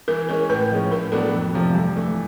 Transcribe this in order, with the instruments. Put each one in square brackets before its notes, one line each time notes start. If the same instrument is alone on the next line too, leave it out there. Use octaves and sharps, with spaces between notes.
[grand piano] E3 [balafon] A#4
[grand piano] G#3 C#4 [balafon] A#4
[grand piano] A2 [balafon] B4
[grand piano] F3 G#3 C#4
[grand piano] A2 [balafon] A#4
[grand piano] F#3 B3 D4 [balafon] A4
[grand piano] F2
C3 F3 A3
G2
E3 A3